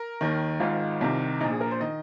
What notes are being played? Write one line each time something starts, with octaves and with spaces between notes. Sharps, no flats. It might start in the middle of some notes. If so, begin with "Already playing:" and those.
Already playing: A#4
D#2 D#3
G#1 G#2 D#3 F4
C2 C3 D#3
A#1 A#2 D#4
G#4
A#4
C5
D#3 D#5